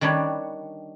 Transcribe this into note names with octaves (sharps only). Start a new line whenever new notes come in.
D#3 G3 D4 B4 C#5